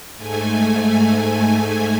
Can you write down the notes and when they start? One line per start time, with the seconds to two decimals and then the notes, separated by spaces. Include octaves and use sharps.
0.16 G#2 A3 G#5